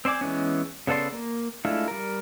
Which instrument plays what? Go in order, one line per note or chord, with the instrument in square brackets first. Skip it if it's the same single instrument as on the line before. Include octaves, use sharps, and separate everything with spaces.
[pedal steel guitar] C4 C5 D5 G#5 D6
E3 G#3 B3 C#4
C#3 B3 A4 D5 C6
A#3
G#3 A3 D4 E4 F4
G3 A#4